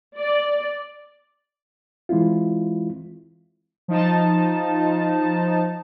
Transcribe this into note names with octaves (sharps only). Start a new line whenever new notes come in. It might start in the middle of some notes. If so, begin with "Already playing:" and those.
D5
E3 G#3 C4 E4 F4
F3 D#4 A5